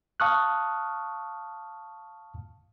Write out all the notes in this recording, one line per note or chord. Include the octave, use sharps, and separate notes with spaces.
F5 A5 C#6 D#6 F6 F#6